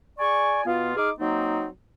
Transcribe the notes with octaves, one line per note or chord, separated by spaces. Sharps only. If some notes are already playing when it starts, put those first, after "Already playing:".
G#4 D5 G#5 C#6
B2 B3 F4
D#4 G#4 D6 F6
F#3 A#3 C4 D#4